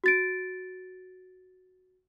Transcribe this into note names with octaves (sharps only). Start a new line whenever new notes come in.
F#4 A6 D7